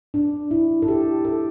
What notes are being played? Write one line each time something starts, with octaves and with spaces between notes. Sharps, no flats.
D4
E4
A4
G4
A4